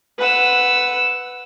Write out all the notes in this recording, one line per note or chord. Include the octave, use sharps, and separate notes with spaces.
B4 F#5 E6